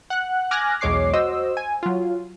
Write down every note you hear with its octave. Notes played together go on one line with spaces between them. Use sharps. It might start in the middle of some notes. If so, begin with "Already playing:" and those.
F#5 F#6
G#5 D6 F6 F#6 G#6 A#6
B1 E2 G#3 C#5 D6 C7
F#4 C5 D#5 E6
G#5
F#3 F4